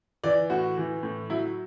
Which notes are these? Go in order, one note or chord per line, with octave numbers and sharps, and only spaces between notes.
E3 D5
A2 F#4
E3
A2
F#3 E4